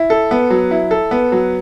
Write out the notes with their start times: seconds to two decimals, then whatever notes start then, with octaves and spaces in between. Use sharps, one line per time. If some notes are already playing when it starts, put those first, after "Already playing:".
Already playing: E4
0.10 A4
0.31 B3
0.50 F#3
0.71 E4
0.91 A4
1.11 B3
1.32 F#3